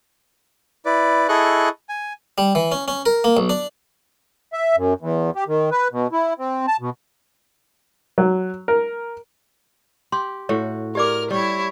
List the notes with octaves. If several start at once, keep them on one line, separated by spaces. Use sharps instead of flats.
E4 B4 D5
E4 G#4 A4 D#5 C#6 F#6
G#5
G3
E3
C#4
C#4
A#4
A#3
B1
D4
E5
F#2
E2
G4
D#3
B4
B2
E4
C4
A5
B2
F#3
A#4
G4 C6
A2 F#4 C#5
G4 A#4 D5 D6 F6
G3 E4 C#5